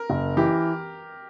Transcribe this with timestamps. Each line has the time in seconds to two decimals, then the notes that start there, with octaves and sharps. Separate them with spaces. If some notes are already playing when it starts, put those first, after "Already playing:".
Already playing: A#4
0.10 F#1
0.37 E3 G4